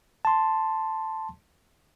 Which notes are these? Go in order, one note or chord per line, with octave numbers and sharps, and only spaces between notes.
A5 C6